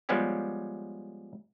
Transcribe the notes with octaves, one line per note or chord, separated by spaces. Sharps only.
F3 G3 G#3 B3 C#4 G4